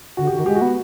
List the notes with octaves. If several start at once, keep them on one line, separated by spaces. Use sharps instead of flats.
D3 F#4
G4
D3
D#3 F#4
G#3 G4
F#4
B3